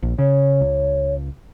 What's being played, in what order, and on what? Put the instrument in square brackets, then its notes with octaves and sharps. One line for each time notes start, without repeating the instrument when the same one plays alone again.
[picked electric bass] A#1
[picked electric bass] C#3 [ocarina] C#5
[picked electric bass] C#2